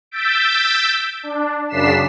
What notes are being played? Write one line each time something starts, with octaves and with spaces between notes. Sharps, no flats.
E6 G6 A6 B6 D7
D4
F#2 C#3 D4 B6 C7 E7